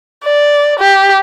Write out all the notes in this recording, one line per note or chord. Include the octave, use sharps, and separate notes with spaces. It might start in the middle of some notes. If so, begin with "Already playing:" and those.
D5
G4